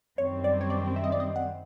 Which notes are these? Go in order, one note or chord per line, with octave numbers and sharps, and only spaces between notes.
F#2 D#3 G3 C4 C#5
D5
C#5
D5
E5
D#5
D5
D#5
F#5